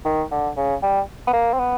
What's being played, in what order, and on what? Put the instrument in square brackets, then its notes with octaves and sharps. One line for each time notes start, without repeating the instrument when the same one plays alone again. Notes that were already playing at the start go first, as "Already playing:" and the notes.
[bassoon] D#3
D3
C#3
G3
B3
A#3
C4
B3